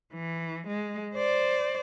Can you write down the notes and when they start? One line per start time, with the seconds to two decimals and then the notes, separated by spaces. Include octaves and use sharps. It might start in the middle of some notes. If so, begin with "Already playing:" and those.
0.14 E3
0.67 G#3
1.14 C5 D5